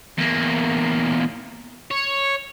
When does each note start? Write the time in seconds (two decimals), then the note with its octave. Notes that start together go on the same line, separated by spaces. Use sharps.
0.18 E2 A#3
1.91 C#5